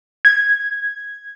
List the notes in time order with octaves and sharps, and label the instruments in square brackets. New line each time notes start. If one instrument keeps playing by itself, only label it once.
[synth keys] G#6